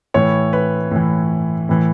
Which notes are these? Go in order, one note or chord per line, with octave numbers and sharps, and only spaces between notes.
A2 E3 C#5 C#6
B4 B5
A2 E3
A2 E3